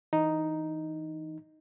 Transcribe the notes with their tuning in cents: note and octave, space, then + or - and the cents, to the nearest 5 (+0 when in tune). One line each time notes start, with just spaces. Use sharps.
E3 -15 D#4 +0